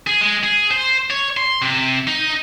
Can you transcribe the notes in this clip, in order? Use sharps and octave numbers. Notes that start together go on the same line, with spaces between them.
G#4
G#3
G#4
C5
C#5
C6
C3
D#4